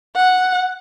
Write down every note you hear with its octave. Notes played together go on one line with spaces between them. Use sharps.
F#5